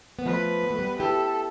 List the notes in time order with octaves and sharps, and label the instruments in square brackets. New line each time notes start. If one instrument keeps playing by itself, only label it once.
[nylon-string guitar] B3
[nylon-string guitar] F3 A3 [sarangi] B4
[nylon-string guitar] B3
A3
G3 B3
[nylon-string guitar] E4 G4 [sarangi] A4